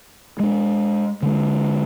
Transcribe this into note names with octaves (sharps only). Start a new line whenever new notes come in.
G#3 D4
D3 G#3